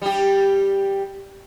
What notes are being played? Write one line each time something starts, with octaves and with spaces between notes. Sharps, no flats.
G3 G4